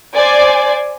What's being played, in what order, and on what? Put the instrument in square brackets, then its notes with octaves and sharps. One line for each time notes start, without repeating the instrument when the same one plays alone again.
[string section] C5 D5 G#5